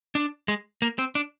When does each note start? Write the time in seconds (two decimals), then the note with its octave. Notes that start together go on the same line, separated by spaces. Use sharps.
0.15 D4
0.48 G#3
0.82 A#3
0.99 C4
1.15 D4